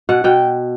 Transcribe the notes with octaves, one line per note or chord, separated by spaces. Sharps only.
B2 F#5
B2 G5